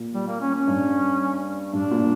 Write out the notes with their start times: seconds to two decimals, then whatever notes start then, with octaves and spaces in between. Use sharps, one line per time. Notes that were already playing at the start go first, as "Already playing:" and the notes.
Already playing: A#2
0.14 G3
0.27 A#3
0.41 C#4
0.54 C#4
0.67 G2
1.73 G2 D4
1.91 A#2